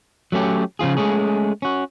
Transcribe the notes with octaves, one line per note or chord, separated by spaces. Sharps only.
F#3 A3 C#4 G4
C#3 F3 F4 G#4
G#3 A3 C#4 G#4
C#4 F#4